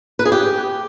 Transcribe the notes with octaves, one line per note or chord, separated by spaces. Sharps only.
B4
G#4
G4